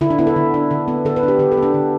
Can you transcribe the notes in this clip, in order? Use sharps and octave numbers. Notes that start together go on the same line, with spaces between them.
D3 E4
D4
B3 E4
A4
D3
D4
D3
B3
D3 A4
B4
D4
G4
D3 G4
A4
B3
D4
D3